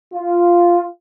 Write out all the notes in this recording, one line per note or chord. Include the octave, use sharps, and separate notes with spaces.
F4